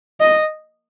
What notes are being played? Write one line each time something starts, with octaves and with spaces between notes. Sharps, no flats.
D#5